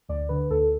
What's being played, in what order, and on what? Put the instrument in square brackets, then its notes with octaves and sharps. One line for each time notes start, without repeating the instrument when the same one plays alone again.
[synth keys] D2 D5
D3 B4
D2 A4